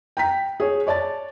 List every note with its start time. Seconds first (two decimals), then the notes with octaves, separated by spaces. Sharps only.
0.17 G5 A#5 B6
0.60 G#4 C#5
0.87 C#5 D5 A5 A6